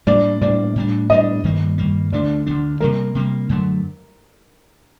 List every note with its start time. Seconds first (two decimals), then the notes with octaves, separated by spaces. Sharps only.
0.07 A2 G3 A#3 D4 D5
0.41 A2 G3 A#3 D4 D5
0.76 A2 G3 D4
1.10 A2 G3 D4 D#5
1.44 G2 D#3 G3 A#3
1.78 G2 D#3 G3 A#3
2.12 D2 D3 A3 D4 D5
2.46 D2 D3 A3 D4
2.80 C3 G3 A#3 A#4
3.15 C3 G3 A#3
3.49 F#2 D3 F#3 A3